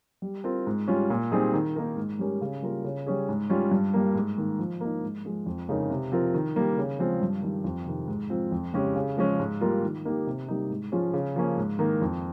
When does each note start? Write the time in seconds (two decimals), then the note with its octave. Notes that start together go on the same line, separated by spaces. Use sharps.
0.22 G3
0.44 C4 F4 A#4
0.67 G#2
0.88 G3 C#4 F4
1.10 A#2
1.32 G3 C4 D#4 G#4
1.54 D#3
1.76 A#3 D#4 A#4
1.97 G#2
2.19 G3 C#4 G4 A#4
2.41 C#3
2.62 G3 A#3 F4 A#4
2.85 C#3
3.06 G3 C#4 G#4
3.29 G#2
3.50 G3 C#4 F4
3.71 G2
3.94 G3 A#3
4.15 G#2
4.38 D#3 A#3
4.59 F3
4.81 A#3 D#4
5.02 G#2
5.25 F3 G#3
5.46 F2
5.69 C#3 G#3 D#4 A#4
5.90 C3
6.12 F3 C4 F4 A#4
6.34 D#3
6.56 G3 A#3
6.78 C#3
6.99 F3 G#3 C4 F4
7.22 G2
7.42 D#3 G3
7.64 F2
7.86 C3 D#3
8.08 G#2
8.30 F3 C4 F4
8.52 F2
8.74 C#3 G#3 C#4 G4
8.96 C#3
9.17 F3 G#3 C#4
9.40 G#2
9.61 G3 A#3 F4 A#4
9.83 D#3
10.05 A#3 D#4 G4
10.27 C3
10.48 G3 A#3 D#4
10.70 G#2
10.92 F3 G#3 C#4 F4
11.13 C#3
11.36 F3 A#3 C#4
11.57 G#2
11.79 D#3 A#3
12.02 F2